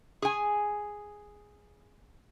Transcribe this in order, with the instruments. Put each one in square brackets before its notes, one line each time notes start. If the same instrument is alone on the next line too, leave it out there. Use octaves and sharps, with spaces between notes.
[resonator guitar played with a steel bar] G#4 G#5